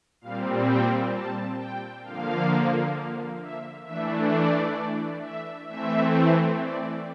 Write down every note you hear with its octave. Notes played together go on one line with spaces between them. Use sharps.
A#2 G3 C4 F5
G5
A5
G5
D3 F3 A#3 F5
E5
E3 A3 D4 E5
D5
E5
E3 A3 C4 E5
D5